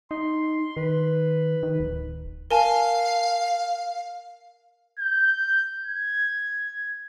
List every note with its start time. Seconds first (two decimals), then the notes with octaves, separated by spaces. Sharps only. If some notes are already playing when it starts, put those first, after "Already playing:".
0.11 D#4 C6
0.77 D#3 B4
1.63 D#3
1.80 D1
2.51 A#4 F5 G#5 A5
4.99 G6
5.83 G#6